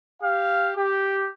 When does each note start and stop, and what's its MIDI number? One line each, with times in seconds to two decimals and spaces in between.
0.21 0.70 67
0.21 0.70 77
0.76 1.27 67